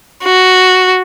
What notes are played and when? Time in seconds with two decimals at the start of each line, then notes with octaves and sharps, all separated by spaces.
0.24 F#4